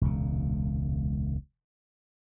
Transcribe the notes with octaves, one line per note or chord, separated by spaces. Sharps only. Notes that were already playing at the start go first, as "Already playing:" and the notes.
E1 C#2 A#2